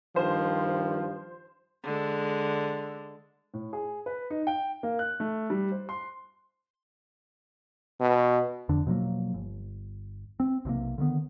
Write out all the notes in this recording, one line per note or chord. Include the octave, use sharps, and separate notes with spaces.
G2 D#3 F3 C5
D3 G#3
A2
G#4
B4
D#4
G5
A#3
F#6
A3
G3
C5
C6
B2
E1 F2 D3 D4
B2 F3 F#3 A#3
G1
C4
B1 C3 D#3 A#3
D3 D#3 B3